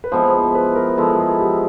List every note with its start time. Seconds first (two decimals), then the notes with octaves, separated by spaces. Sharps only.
0.04 B4
0.12 F3 G#3 B3 E4 C5
0.34 C5
0.55 B4
0.76 A#4
0.97 F3 G#3 B3 E4 A4
1.19 G#4
1.40 G4